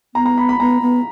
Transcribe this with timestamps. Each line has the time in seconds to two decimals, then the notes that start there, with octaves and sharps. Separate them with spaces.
0.15 B3 A#5
0.26 A#5
0.38 B5
0.49 B5
0.60 B3 A#5
0.82 B3